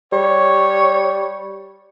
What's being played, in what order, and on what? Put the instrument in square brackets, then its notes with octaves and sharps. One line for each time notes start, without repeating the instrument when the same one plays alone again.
[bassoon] G3 [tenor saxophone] C#5